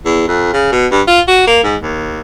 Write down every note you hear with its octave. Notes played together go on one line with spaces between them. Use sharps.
E2
F2
C#3
B2
G2
F4
F#4
A#3
G#2
D#2